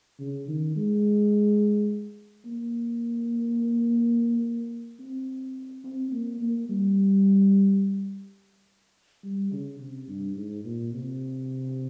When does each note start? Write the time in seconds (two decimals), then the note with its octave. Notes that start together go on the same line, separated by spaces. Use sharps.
0.20 C#3
0.48 D#3
0.76 G#3
2.46 A#3
5.00 C4
5.84 C4
6.12 A#3
6.41 A#3
6.69 G3
9.23 G3
9.52 C#3
9.80 C3
10.08 G2
10.36 G#2
10.64 A#2
10.93 C3